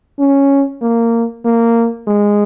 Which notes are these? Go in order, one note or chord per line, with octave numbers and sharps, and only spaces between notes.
C#4
A#3
A#3
G#3